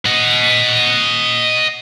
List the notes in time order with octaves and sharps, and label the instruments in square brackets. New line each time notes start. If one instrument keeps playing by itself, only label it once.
[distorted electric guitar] D#5 F#5